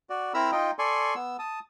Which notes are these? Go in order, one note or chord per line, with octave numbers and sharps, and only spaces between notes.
F#4 D5
C4 E4 A#4 A#5 B5 E6
D#4 F4 D#5 G5
A4 D5 G#5 C6 C#6
B3 E6
A5 D#6